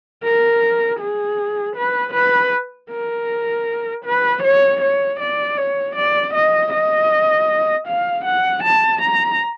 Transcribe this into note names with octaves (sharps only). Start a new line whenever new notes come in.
A#4
G#4
B4
B4
A#4
B4
C#5
C#5
D5
C#5
D5
D#5
D#5
F5
F#5
A5
A#5